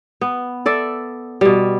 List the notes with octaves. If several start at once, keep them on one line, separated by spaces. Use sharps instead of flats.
B3
A4 D5 E5
B2 G3